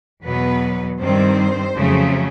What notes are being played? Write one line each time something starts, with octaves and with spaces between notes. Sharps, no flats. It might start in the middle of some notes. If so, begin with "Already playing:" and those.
E2 B2 F#3 B3 B4
G2 D#3 G3 C4 C5
F2 C#3 F#3 A3